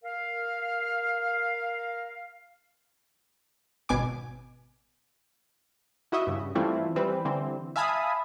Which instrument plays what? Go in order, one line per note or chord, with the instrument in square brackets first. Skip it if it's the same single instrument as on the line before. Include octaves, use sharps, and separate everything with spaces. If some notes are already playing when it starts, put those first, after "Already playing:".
[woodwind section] A#4 F5
[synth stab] G#1 B2 G#5 D6
[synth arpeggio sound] E4 F#4 D#5 E5
G2 C#3
E3 G3 A3 C4 E4 F4
E3 G3 C4 B4
D3 E3 G3 C4
E5 F5 G#5 A5 B5 D#6